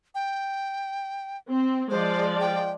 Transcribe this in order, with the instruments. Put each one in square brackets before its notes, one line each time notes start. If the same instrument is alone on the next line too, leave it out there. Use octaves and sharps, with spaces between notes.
[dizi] G5
[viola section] C4
[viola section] F3 G#3 D5 [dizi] C5
[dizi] G5